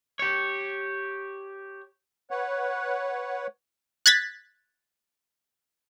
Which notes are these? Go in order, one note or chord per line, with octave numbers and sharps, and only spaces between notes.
G4 C#5
B4 C#5 F#5
F#6 G#6 A6 B6